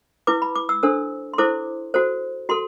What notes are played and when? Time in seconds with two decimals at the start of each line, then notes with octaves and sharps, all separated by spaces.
0.27 E4 B4 D6
0.42 B5
0.55 D6
0.69 E6
0.83 D4 A4 C5 E6
1.34 C6
1.38 E4 A4 C5 D6
1.94 F#4 A4 C5
2.49 F#4 A4 C6